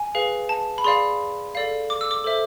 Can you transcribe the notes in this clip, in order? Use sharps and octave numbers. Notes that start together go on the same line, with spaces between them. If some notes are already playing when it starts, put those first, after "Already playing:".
Already playing: G#5
G#4 B4 F5
A5
B5
G#4 D5 F5 C6
A4 D5 F5
D6
E6
D6
A4 C5 E5